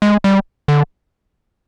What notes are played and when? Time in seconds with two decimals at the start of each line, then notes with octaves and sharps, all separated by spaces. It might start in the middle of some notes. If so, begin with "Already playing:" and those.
0.02 G#3
0.24 G3
0.68 D3